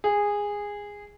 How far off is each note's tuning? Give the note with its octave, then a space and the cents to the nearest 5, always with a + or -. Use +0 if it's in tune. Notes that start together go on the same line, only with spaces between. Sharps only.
G#4 -15